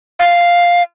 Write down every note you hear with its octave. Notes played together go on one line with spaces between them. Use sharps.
F5